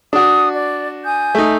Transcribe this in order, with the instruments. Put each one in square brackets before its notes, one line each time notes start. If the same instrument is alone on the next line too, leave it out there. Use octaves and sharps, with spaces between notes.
[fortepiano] D4 F#4 [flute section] D#6
[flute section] D5
G#5 D#6 G6
[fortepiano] A3 D#4